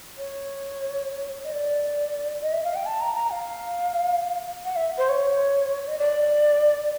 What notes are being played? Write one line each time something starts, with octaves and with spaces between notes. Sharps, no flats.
C#5
D#5
D5
D#5
E5
F5
G5
A5
A#5
A#5
F5
F#5
E5
C5
C#5
D#5
D5